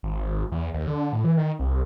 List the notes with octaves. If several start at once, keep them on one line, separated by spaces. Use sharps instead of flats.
G#1
E2
D#2
D3
A2
E3
D#3
C2